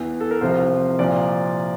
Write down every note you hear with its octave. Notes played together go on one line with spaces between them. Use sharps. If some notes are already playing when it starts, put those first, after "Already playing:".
Already playing: E2 E3
A4
A#4
C2 C3 F3 C5
C2 A#2 F3 D5